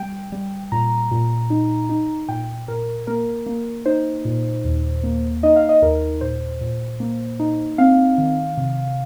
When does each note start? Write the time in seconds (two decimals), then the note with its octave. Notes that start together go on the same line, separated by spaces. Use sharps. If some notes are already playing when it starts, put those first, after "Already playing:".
Already playing: G3 G5
0.32 G3
0.72 A#2 A#5
1.11 A#2
1.50 D#4
1.89 D#4
2.29 A#2 G5
2.68 A#2 A#4
3.07 A#3 A#4
3.46 A#3
3.86 D#4 C5
4.25 A#2
4.65 D#2
5.03 A#3
5.43 D#4 D#5
5.56 F5
5.69 D#5
5.82 D#2 A#4
6.21 A#2 C5
6.61 A#2
7.00 A#3
7.40 D#4
7.78 C4 F5
8.18 D#3
8.57 C3